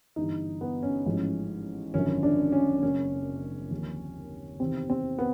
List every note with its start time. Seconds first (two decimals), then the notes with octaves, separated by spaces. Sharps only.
0.16 G1 G2 E3 D#4
0.61 B3
0.83 C#4
1.06 A1 G#2 F3
1.94 G#1 F#2 D3 F3 C#4
2.23 D4
2.52 C#4
2.83 F#1 F#2 C#3 C#4
3.71 D#2 D3 F3
4.59 E2 C3 D#3 C4
4.90 C4
5.18 B3